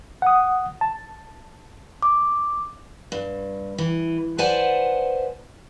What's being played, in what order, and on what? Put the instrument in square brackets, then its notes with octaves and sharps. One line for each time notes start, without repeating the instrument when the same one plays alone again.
[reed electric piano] F#5 D#6
A5
[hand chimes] D6
[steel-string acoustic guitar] G2
E3
B4 C5 D5 F#5 G#5 A5